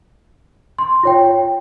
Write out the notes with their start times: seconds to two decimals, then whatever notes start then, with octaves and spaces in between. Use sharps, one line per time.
0.79 C6
1.03 F4 C#5 G5